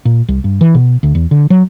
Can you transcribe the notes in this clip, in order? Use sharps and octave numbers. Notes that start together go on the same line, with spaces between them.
A#2
C2
G2
E3
B2
D2
E2
D3
F#3